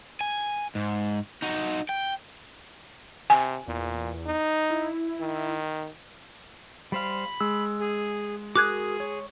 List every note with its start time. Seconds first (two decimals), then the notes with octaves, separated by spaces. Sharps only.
0.21 G#5
0.75 G#2
1.42 D#4 F#4
1.89 G5
3.30 C3 G#5
3.68 E2 A#2
4.26 D#4
4.70 E4
5.21 D#3
6.92 G3 C5 F5 B5
7.40 G#3 E6
7.80 G#4
8.56 F#4 G#4 A#4 D6 D#6 F#6 G#6
9.00 C#5